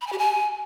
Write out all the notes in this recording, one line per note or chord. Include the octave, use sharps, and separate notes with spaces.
B5
G#5
G4
G#5